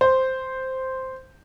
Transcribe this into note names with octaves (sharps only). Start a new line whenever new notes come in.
C5